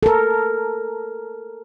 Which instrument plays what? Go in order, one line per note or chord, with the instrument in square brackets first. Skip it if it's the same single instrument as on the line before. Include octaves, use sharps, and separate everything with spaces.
[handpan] A4 A#4